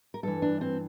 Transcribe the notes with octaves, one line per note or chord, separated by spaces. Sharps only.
A#4
G2 E3 A4
D4
C4